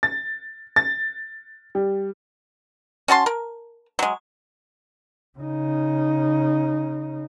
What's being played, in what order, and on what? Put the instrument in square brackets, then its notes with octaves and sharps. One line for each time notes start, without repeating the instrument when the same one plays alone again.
[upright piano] A6
A6
G3
[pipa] C#4 F#4 A5 C6
A#4
F#3 G#3
[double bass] C#3 D#4